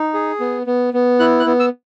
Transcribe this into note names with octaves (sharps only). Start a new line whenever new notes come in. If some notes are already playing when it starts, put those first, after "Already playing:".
Already playing: D#4
G#4
B3
B3
B3
E4 F#6
F#6
B3
E6